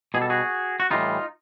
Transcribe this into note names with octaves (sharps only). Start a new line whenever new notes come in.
B2 G3 G#4
A4
F#4 G#4
F#4
A2 E3 G3 D#4 F4